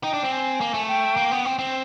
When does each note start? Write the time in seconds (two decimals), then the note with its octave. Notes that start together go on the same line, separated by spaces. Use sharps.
0.03 D#4 G5
0.14 D4
0.23 C4
0.32 G#5
0.61 A#3
0.74 A3
0.88 G5
1.17 A#3
1.31 B3
1.45 C4
1.59 C4